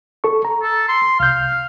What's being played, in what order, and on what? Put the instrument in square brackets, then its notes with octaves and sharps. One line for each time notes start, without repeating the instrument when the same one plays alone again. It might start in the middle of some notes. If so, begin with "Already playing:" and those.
[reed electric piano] A4 C#6
A#5
[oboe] A4
C6
[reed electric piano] C2 G6 [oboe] F5